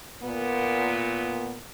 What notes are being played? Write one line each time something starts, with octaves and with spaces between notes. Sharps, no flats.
A#2 B3